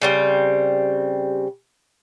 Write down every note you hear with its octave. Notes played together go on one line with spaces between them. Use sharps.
C#3 G3 C4